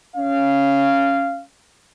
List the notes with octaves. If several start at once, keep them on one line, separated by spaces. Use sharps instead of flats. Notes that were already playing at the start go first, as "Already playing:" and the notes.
C#4 F5